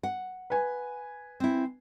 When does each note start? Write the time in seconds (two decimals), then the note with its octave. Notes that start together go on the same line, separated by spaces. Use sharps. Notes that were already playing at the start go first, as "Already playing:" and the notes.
0.03 F#5
0.50 B4 G#5
1.40 C4 E4